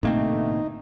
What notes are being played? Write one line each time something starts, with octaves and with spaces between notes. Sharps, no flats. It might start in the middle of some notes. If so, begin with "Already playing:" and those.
A1 G#2 B2 D3 A3 A#3 C4 D#4